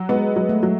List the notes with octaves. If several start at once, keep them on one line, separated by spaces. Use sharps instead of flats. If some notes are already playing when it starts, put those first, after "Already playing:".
Already playing: F#3
G#3 B3
F#3
A3
F#3